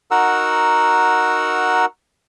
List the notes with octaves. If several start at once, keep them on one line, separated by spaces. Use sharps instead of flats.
D#4 F#4 A#4 F#5 E6